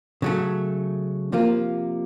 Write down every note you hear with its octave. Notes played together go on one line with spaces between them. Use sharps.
C#3 F#3 A3
C3 F3 A#3 F4